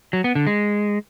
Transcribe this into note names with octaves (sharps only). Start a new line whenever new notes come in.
F#3
B3
D3
G#3